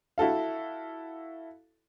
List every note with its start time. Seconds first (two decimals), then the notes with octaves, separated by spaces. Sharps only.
0.18 E4 F#4 A4 F5